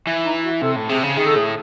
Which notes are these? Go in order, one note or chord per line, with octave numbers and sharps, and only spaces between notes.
E3
D#4
F#4
C3 A4
A2
C3 G#4
C#3
D#3 G#4
A4
A2 G#4